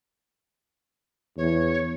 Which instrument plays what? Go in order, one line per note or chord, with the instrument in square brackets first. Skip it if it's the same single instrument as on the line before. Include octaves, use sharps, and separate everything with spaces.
[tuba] E2 [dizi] C#5